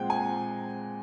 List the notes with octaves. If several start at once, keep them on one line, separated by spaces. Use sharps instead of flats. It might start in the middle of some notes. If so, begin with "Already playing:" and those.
Already playing: A#2 F3 G#3 C4 F#5 G5
G#5